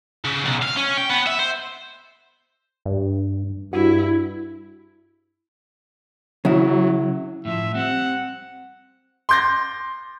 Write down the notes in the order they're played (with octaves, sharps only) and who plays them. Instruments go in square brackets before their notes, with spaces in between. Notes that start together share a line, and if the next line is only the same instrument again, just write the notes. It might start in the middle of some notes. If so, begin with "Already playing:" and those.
[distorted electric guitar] C#3
B1
F5
C#4
G5
B3
E5
C5
[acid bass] G2
[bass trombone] G2 [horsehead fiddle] E4 [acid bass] F#4
[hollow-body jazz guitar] C#3 E4 [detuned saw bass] F#3
[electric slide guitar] A2 F3 [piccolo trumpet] E5
[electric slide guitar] G3 C4 [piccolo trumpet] F#5
[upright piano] C6 D6 G6 A6 A#6